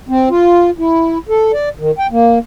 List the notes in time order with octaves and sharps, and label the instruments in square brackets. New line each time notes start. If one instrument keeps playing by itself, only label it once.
[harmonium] C4
F4
E4
A4
D5
D#3
G5
A#3